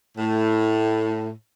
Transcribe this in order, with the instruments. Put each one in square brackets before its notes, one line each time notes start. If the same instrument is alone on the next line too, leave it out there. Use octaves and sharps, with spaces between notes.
[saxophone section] A2